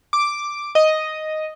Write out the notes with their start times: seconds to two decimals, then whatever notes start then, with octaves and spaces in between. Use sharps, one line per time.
0.13 D6
0.75 D#5